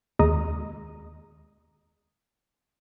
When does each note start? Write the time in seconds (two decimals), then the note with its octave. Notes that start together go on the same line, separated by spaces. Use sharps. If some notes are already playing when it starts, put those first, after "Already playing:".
0.19 D#2 G#3 A#5 D#6